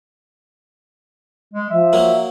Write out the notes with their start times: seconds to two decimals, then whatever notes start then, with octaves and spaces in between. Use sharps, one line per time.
1.54 G#3
1.70 F3 E5
1.93 F#3 A#3